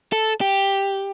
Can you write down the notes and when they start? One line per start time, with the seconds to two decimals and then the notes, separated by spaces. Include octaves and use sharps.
0.13 A4
0.41 G4